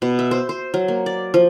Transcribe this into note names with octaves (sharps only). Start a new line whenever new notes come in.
B2
E5
C5
C5
F#3
A#3
D5
F3